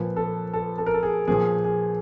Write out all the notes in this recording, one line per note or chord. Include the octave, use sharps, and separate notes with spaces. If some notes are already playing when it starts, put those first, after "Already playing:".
Already playing: A#2 F3 B4
A4
A4
A4
A#4
A4
G#4
A#2 F3 G#4
G#4